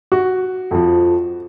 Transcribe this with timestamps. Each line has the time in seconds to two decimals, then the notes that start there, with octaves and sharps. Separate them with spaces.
0.12 F#4
0.71 F2 F3